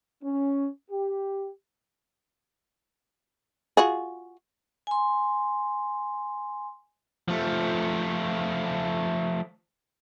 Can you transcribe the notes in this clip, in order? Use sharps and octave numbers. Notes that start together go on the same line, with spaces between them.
C#4
G4
F4 F#4 G#4
G#5 C6
F3 A3